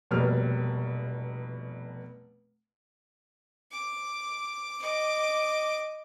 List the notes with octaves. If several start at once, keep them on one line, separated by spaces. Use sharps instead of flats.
F1 B2 F#3 G3 A#3 F6
D6
D#5 D6